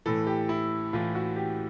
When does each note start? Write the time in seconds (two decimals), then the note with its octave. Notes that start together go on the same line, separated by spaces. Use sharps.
0.06 A2 E3 A4
0.27 G4
0.49 E4
0.93 A2 E3 F4
1.15 F#4
1.36 G4